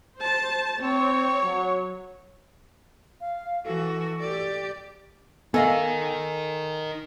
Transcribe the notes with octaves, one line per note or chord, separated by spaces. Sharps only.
C5 A5
C4 C#5
F#3
F5
E3 F#4 A4
G4 D5
B3 D#4 A4 A#4 D#5 F5 G#5